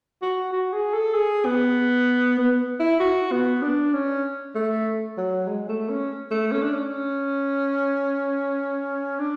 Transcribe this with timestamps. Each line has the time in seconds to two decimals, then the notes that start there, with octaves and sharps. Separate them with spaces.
0.22 F#4
0.52 F#4
0.73 G#4
0.93 A4
1.14 G#4
1.46 B3
2.38 B3
2.80 E4
3.00 F#4
3.32 B3
3.62 D4
3.93 C#4
4.55 A3
5.18 F#3
5.48 G#3
5.69 A3
5.90 C#4
6.31 A3
6.52 C#4
6.62 D4
6.72 C#4
9.19 D4